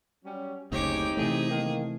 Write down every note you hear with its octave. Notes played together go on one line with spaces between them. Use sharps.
F#3 G3 C#4
F#1 D2 C#3 C4 D#4 G4 C#5 D6
C3 E3 A3 G#4
D#3 A#3